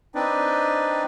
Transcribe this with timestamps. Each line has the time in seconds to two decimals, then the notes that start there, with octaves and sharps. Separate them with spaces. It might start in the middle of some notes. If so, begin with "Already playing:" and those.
0.15 C4 D4 D#4 B4 D5